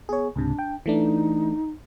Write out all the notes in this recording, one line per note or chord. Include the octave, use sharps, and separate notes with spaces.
B3 G#4 C#5
C#2 G#2 C3 D4
G5
E3 A3 D4 D#4